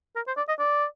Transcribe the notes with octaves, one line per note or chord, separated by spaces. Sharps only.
A#4
C5
D5
D#5
D5